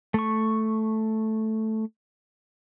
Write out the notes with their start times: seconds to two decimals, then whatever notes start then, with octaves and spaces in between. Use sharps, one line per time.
0.14 A3 C#6